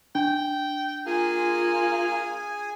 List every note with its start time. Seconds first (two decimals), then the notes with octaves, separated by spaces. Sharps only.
0.15 D4 G5
1.06 A#3 F4 G#4 G#5